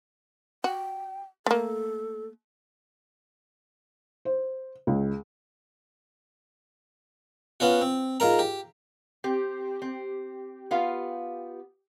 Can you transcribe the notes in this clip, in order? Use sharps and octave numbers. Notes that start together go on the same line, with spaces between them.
F#4 G5
A3 A#3 A4
C5
C#2
B3 C#4 F4 F#4
C4
G#2 F4 A#4 A#5
G4
C4 G4
C4
B3 F4 F5